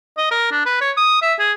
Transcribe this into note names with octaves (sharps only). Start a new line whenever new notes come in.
D#5
A#4
D4
B4
C#5
D#6
E5
G#4